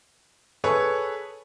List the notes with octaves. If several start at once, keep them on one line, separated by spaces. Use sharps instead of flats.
G#4 A4 B4 C#5